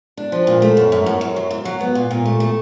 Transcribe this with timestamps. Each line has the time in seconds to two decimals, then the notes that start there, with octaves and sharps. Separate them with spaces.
0.17 D4
0.32 F3
0.47 A#2
0.62 A3
0.77 F#2
0.92 F#2
1.06 F#2
1.21 F#2
1.36 F#3
1.51 C#3
1.65 F#3
1.81 B3
1.95 A#2
2.11 A#2
2.25 A3
2.40 A3